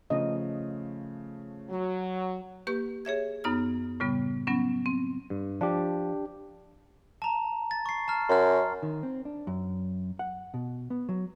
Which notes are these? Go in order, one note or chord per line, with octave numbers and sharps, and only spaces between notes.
C#3 F3 A3 D#5
F#3
A#3 G4 B4 C#6 G6
G#4 C#5 E5 G#6
F#2 B3 D#4 A#5 F6
A2 C#3 G3 B3
F#3 B3 C#4
C4
G2
F3 D4 G4
A5 A#5
A6
C#6 C7
A5 A#5 F6
F#2 C6 F6
D#3
C4
D4
F#2
F#5
B2
B3
F#3